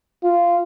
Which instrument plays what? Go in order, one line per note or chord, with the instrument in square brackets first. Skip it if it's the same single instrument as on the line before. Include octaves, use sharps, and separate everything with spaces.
[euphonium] F4